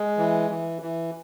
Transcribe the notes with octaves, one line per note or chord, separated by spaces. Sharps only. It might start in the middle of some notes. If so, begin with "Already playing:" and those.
Already playing: G#3
E3
E3
E3